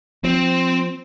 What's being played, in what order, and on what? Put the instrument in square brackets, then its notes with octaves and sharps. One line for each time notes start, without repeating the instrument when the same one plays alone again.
[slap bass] F3 [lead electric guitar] C4